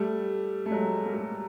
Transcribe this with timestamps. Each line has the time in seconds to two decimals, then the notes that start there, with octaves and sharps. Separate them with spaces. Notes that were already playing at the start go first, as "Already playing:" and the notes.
Already playing: G3 A3
0.66 A3
0.71 F#3 G#3
1.06 A#3
1.13 G3 A3